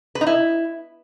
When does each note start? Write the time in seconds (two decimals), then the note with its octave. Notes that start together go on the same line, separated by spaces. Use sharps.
0.15 B4
0.21 D#4
0.27 E4